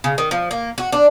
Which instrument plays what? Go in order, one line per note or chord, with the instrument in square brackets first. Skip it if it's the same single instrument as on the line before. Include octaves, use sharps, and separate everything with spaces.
[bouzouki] C#3
D#3
F3
A#3
F#4
D4